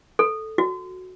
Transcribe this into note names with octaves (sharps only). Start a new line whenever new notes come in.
A4
F#4